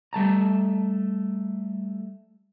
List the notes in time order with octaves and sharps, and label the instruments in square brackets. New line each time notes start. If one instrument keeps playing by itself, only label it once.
[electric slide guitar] G3 A3 A5 A#5